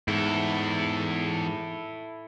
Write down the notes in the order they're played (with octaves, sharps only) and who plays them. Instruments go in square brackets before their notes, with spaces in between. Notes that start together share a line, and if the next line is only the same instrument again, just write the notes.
[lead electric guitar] E2 [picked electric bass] G#2 [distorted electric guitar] E4 A4